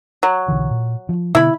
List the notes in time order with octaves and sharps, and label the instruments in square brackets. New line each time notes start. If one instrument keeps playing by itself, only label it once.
[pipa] F#3
[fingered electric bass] B1 D3 E3
A#2
F3
[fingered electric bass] B2 D3 B3 [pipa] E4 B5